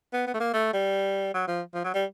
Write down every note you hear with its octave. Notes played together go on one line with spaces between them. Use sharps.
B3
B3
A3
A#3
A3
G3
F#3
F3
F3
F#3
G3